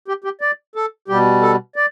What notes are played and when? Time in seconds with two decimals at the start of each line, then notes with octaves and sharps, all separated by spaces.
0.08 G4
0.24 G4
0.41 D5
0.76 A4
1.08 B2 G3 G4
1.42 A4
1.76 D5